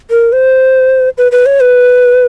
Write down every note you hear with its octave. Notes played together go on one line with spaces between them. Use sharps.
A#4
C5
B4
B4
C#5
B4